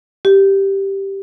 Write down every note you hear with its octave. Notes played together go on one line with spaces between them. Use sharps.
G4